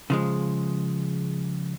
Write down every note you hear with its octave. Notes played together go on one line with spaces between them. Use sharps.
C#3 F3 G#3